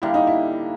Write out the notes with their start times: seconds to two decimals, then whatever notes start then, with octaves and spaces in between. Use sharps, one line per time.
0.02 D3 G3 A#3 E4
0.14 D#4
0.27 E4